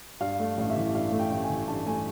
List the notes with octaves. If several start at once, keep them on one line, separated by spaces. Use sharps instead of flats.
G2 F5
A3
A1 F5
E5
E3
G2 F5
A3
G5
A1
G#5
E3
G2 A5
A3 G#5